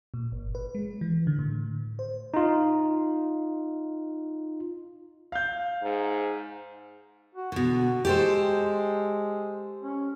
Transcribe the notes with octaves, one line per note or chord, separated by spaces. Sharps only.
A#2
G1
B4
G#3
E3
D3
A2
C5
D#4 F4
F5 G6
G#2
F#4
B2 D3 F#4
G#3 G4 A4 C5
C#4